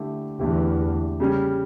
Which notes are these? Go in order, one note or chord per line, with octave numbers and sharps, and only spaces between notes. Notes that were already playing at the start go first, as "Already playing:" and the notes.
Already playing: D3 A3 E4 G4
E2 D3 A3 E4 G4
C#3 G3 C#4